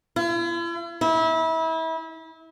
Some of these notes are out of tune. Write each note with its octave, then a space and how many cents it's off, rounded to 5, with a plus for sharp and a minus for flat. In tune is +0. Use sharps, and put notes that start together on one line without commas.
E4 +45
E4 -30